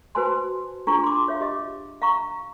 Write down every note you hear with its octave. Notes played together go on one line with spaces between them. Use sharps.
F#4 B4 C5 G#5 A5 C6
D4 F4 G#4 A#5 C#6
C6 D6
C#5 E5 F5
G4 D#5 D6
F5 A#5 C#6